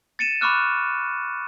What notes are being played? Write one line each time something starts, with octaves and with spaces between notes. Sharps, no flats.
A6 C#7 D#7 E7
B5 C#6 D6 F6 F#6